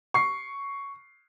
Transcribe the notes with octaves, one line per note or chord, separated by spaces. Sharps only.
C#6 C7